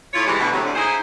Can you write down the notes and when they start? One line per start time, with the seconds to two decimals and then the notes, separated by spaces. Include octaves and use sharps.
0.14 A2 E4 F4 C#5
0.26 E3 G3 G#3
0.40 D2 B2
0.52 A2 C3 F#3
0.64 D2
0.75 D#4 E4 G#4 C5